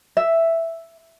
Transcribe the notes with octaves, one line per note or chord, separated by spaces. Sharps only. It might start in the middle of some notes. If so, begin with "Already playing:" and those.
E5